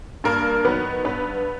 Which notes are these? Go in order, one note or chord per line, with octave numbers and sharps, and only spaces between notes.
G2 A#3 A#4
D#3 F#3 B3 B4
G2 B3 B4